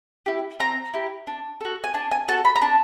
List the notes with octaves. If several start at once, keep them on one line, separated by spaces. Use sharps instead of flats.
E4 G4
C4 A#5
E4 G4
D4
F#4 A4
G#5
D4 A5
G#5
F#4 A4 A5
B5
A#5
D4 A5